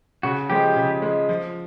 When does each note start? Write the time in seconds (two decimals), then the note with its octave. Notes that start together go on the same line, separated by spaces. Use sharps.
0.23 C#3 F#4
0.50 F3 G#3 G4
0.76 C#3
1.02 F3 G#3
1.29 F3